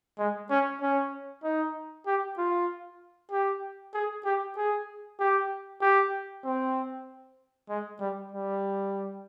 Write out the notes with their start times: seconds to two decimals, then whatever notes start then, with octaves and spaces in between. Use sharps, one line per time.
0.19 G#3
0.50 C#4
0.81 C#4
1.43 D#4
2.07 G4
2.38 F4
3.32 G4
3.94 G#4
4.25 G4
4.57 G#4
5.19 G4
5.81 G4
6.44 C4
7.69 G#3
8.00 G3
8.32 G3